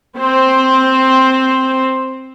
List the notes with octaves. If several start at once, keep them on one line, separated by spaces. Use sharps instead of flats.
C4 C5